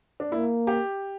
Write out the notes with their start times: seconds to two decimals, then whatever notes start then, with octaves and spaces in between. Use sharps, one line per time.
0.20 D4
0.32 A#3 E4
0.67 G4